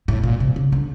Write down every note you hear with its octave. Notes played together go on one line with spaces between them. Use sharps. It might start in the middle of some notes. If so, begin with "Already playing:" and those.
A2
A#2
C3
C#3
D3